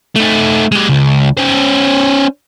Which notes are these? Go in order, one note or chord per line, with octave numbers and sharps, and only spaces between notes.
A3 D#4
G#3 G4
C#2
C#4 C5